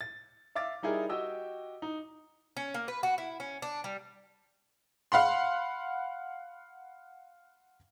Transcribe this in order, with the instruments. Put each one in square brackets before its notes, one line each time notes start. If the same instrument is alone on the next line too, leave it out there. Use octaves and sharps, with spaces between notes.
[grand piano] A6
E5 F5 D6 A6
G3 D#4 E4 G#4 A#4
F#4 G4 D#5 G5 E6
D#4
[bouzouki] C#4
A#3
B4
F#4
E4
C#4
D4
G3
[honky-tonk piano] F5 F#5 B5 C6